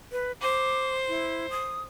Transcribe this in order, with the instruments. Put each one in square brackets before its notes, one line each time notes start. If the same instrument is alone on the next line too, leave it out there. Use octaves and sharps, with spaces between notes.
[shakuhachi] B4
[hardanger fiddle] C5 [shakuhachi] D6
[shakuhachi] E4
D#6